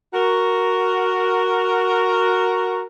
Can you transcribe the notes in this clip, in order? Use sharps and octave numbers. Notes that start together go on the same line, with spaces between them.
F#4 A#4